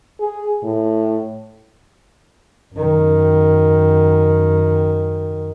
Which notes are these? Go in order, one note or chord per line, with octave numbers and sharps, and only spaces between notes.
G#4
A2
F#2 D#3